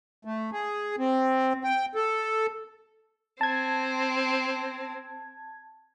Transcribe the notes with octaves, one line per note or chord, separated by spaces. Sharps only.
A3
G#4
C4
G5
A4
C4 A5 G#6